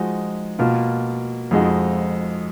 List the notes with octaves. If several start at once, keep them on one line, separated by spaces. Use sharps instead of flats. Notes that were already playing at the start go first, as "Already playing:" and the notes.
Already playing: F3 G#3 D#4 F#4
B2 A#3 F4
F2 F3 G#3 D#4 F#4